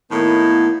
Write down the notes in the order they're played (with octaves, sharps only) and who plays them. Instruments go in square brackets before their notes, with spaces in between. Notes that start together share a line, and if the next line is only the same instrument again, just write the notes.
[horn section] A2 D#3 [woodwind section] A#3 B3 E4